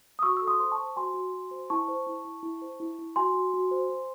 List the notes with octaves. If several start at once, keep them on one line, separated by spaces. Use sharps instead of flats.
D#6
F#4 C#6 E6
A4 E6
C6 D#6
C5 C6
A5 C#6
C5
F#4 G#5 C6
F#4
F#4
C5
E4 A5 C#6
C5
E4
E4
E4
C5
E4
E4
F#4 G#5 C6
F#4
F#4
C5
C5